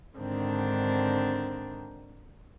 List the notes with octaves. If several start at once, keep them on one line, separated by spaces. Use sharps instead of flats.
G#2 D3 D#3 C4 D4